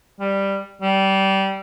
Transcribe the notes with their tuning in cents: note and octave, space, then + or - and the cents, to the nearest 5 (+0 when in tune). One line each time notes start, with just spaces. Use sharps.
G3 +5
G3 -20